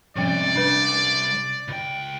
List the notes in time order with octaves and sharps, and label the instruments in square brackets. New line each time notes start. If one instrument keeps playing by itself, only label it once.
[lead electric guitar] G#2 C3 [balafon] F3 G3 C#4 [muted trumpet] D5
[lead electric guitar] C2 [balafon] D4 B4
[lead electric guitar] C#2 G5